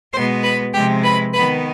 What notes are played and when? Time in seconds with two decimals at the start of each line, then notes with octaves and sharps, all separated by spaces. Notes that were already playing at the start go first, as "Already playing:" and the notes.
0.14 B2 G#3 B3 C5 C6
0.44 B4 B5
0.74 C3 F3 G#3 G4 G5
1.04 B4 B5
1.34 D#3 B3 B4 B5